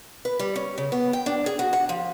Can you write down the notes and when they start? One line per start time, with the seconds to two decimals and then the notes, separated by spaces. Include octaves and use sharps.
0.25 B4
0.39 G3
0.56 C#4
0.78 C#3
0.92 B3
1.13 G5
1.26 D4
1.46 G#4
1.59 F#4
1.73 F#5
1.89 F3